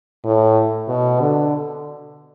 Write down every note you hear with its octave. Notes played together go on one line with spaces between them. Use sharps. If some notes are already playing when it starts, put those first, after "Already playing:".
A2
B2
D3